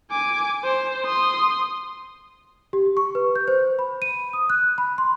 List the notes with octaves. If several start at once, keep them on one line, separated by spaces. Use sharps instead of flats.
G#5 D6
C5
C6 D#6
G4
C#6
B4
G6
C5
B5
D#7
D#6
F#6
B5
C6